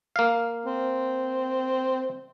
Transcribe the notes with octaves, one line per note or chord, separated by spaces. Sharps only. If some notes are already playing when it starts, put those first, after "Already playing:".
A#3 F5
C4